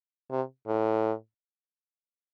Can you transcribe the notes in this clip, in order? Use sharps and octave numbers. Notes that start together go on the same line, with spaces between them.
C3
A2